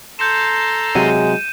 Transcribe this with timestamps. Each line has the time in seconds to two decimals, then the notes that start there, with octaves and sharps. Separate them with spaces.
0.19 A4 A#5 C6 G6 C#7 E7
0.95 C3 F#3 G#3 D#7